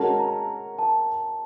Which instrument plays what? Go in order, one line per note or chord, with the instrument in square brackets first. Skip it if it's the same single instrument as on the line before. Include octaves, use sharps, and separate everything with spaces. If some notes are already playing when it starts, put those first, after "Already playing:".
Already playing: [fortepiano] G#3 C#4 F#4 A#4 [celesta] A5
[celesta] A#5
A5